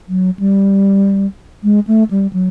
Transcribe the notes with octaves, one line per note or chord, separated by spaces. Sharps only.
F#3
G3
G#3
A3
G3
F#3